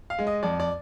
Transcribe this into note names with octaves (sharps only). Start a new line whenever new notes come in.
F5
G#3
D#5
F2 D5
D5